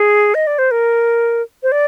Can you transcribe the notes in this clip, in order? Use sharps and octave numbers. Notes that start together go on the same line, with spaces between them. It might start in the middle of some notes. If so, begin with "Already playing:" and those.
Already playing: G#4
D#5
D5
C5
A#4
C5
D5